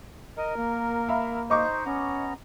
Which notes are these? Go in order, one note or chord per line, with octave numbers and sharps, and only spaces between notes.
A#4 D#5
A#3
E5 F5 B5
D#4 C5 D#5 C#6 D6
B3 C#4 A#5